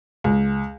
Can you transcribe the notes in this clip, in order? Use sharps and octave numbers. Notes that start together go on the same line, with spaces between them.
C#2